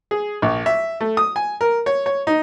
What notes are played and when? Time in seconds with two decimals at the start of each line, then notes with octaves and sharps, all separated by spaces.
0.11 G#4
0.42 A#1
0.66 E5
1.00 A3
1.17 D#6
1.36 G#5
1.61 A#4
1.86 C#5
2.06 C#5
2.27 D#4